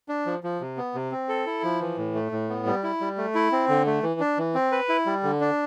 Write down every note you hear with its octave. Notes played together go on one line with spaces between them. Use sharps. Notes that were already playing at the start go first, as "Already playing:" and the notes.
D4
F3
F3
C3
B3
C3
C4
A4
E4
F3
E3
A2
A3
A2
B3
G3
E4
G3
A3
E4
C4
D3
A3
E3
D4
E3
C4
B4
E4
G3
D3
D4